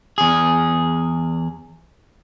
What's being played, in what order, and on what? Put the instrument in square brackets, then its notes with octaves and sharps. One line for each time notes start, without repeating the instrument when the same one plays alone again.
[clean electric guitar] E2 G#4